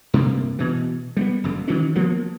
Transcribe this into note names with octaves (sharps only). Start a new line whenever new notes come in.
G2 C3 A#3
B2 E3
G3 A#3 B3
F#1 F#2 D3
D#3 E3 F#3 C#4
F3 F#3 A#3 B3